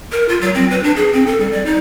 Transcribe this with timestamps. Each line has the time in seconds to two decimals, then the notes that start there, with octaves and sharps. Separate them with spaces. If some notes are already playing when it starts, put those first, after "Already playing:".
0.12 A#4
0.29 F4
0.41 F#3
0.55 C4
0.71 B4
0.83 D4
0.97 G#4
1.13 C4
1.27 A4
1.40 G3
1.52 D5
1.66 D#4